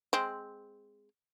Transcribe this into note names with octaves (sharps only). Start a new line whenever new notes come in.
G#3 C4